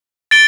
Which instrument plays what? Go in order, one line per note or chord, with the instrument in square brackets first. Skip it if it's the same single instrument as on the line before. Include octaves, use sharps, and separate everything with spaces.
[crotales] A6 D7 G7